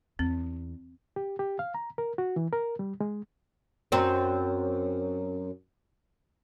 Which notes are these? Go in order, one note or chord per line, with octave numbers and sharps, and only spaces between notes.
E2 C4
G4
G4
F5
A#5
A#4
F#4
E3
A#4
G3
G#3
F#2 C4